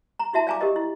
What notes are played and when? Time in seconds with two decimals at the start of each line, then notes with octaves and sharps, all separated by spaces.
0.19 A#5
0.33 E4 F#4 E5 A5
0.47 D5 F5 G#5 A#5 D6
0.61 G4 A#4 D#5
0.76 E4